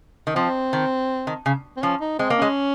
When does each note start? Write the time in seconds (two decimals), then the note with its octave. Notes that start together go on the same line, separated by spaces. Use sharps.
0.27 D#3
0.35 F3 C4
0.73 D#3
1.27 D#3
1.46 C#3
1.77 C4
1.82 F3 C#4
2.01 D#4
2.19 G#3 C4
2.30 A#3
2.38 G#3 C#4